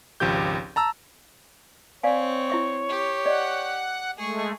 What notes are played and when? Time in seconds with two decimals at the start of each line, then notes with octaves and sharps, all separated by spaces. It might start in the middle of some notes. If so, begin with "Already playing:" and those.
0.20 G#1 C#2 F3 G4 G6
0.76 A5 A#5 E6
2.03 C4 C#5 D5 F5 G#5
2.50 E4 E5 C#6
2.89 G4
3.26 D5 D#5 F#5
4.18 G#3 A3 G#4 C#6